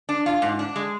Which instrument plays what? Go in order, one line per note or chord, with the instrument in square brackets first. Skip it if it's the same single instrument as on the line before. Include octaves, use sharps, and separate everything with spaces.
[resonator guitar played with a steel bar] D4
F4
G#2
D4
G#3